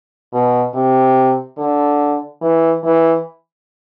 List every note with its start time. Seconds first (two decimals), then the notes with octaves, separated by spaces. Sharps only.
0.33 B2
0.74 C3
1.58 D3
2.41 E3
2.84 E3